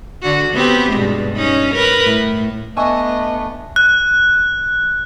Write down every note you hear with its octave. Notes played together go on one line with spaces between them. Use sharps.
D3 F#4
B3 C4 G4
G2 B2 G#3
C#4 D#4
A#4 B4
A2
A3 B3 D4 D#5 G#5 C#6 E6
F#6